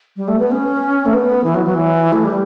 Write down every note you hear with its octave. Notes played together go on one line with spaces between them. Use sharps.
G3
A3
B3
C#4
A3
B3
E3
F#3
F#3
E3
A3
G3